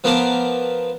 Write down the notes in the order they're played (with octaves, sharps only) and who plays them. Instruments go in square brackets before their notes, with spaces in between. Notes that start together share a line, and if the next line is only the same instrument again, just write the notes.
[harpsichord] F3 B3 A#4 A5 D6